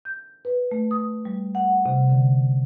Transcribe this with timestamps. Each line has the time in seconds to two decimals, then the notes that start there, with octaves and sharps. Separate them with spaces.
0.05 G6
0.45 B4
0.71 A3
0.91 D#6
1.25 G3
1.55 F#5
1.86 C3
2.10 D3